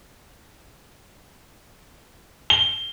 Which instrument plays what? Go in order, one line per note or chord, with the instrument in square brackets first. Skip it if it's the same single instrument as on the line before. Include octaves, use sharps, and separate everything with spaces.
[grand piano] G7